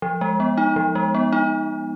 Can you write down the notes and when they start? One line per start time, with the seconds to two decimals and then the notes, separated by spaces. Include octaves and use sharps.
0.02 F3
0.21 G#3
0.40 B3
0.58 D#4
0.76 F3
0.95 G#3
1.14 B3
1.32 D#4